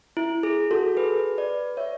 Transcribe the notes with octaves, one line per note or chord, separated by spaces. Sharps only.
E4
G#4
F#4 A4
G#4 B4
B4 D5
C#5 E5